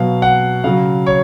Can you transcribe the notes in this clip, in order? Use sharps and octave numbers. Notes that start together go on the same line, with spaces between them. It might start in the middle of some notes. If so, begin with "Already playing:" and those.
Already playing: B2 F#3 F5
F#5
C#3 F#3 F5
C#5